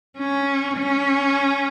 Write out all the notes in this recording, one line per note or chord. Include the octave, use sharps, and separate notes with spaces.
C#4
C#4